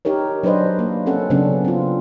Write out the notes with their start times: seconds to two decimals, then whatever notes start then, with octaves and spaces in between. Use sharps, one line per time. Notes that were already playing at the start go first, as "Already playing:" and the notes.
0.05 D#4 G4 A#4 C#5
0.43 F#3 D4 D#4 B4 C5 D#5
0.79 A#3
1.06 C4 C#4 A4 F#5
1.30 C#3 F#3 B3 C#4 D4
1.65 C4 F4